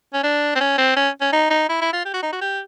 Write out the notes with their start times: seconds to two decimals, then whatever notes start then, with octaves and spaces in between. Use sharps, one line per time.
0.13 C#4
0.23 D4
0.55 C4
0.60 C#4
0.78 C4
0.97 C#4
1.21 C#4
1.32 D#4
1.50 D#4
1.69 E4
1.81 E4
1.93 F4
2.05 G4
2.14 F#4
2.22 D#4
2.32 F#4
2.41 G4